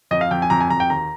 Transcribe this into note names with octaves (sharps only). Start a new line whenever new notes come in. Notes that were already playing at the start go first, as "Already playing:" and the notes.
F2 D#5
F5
F2 G5
G#5
F2 A#5
G#5
F2 A#5
G5
D#2 A#5